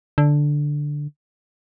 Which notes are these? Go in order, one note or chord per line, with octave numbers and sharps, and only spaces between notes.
D3